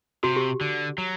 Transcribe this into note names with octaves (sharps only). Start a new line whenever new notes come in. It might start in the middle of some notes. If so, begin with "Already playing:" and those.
C3 F#4
G4
D3
F#3